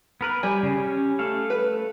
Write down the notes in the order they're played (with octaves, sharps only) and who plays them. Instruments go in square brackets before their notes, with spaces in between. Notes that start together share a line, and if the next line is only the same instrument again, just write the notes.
[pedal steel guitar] B3 A#4 B4
[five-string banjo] G3 [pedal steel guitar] G#5
[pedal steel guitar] C#3
C#4
A3 A4 F5
[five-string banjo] B4